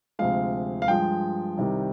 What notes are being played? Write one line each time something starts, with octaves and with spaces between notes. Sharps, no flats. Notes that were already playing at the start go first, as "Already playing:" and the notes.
D2 C3 F3 G#3 F5
F5
G2 F3 G#3 G5
C2 C3 D#3 G3